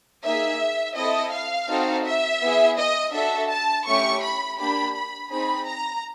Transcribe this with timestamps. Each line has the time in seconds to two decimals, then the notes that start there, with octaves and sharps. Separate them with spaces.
0.24 A#3 D#4 G#4 E5
0.96 C4 E4 A4 D#5
1.32 F5
1.69 C4 D#4 F#4 A4
2.05 E5
2.41 B3 E4 G#4
2.78 D#5
3.14 D4 F#4 A4 E5
3.50 A5
3.86 A3 C#4 E4 G4 C#6
4.22 B5
4.58 A#3 D4 G4 B5
4.95 B5
5.30 C4 D#4 G#4 B5
5.67 A#5